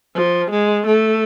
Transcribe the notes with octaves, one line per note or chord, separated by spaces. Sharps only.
F3
G#3
A3